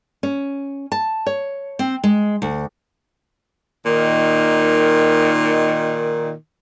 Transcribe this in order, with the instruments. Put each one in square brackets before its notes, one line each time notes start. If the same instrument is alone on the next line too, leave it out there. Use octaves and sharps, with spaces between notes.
[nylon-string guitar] C#4
A5
C#5
C4
G#3
D2
[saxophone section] A#2 D#3